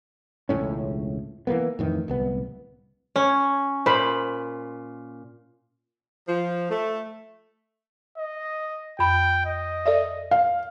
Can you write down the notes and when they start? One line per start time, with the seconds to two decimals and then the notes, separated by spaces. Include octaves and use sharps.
0.49 E1 C#2 A2 C#4
1.47 E3 G3 A#3 B3
1.79 F2 A2 D#3 E3
2.08 D1 C2 B3
3.16 C#4 C#5
3.86 A#2 C5 B5
6.27 F3
6.70 A3
8.18 D#5
8.99 F2 G5 B5
9.46 D#5
9.86 A4 D5 E5
10.31 F5